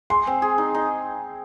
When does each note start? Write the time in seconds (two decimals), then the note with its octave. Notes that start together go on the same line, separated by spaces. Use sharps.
0.10 G#3 C6
0.27 C4
0.42 G#4
0.58 D#4
0.74 D#4